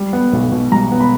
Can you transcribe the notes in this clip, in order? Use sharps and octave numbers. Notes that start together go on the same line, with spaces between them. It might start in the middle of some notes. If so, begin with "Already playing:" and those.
Already playing: G3
B3
B1
B2
G3 A#5
B3
B5